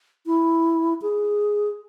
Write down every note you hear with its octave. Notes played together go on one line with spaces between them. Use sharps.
E4
G#4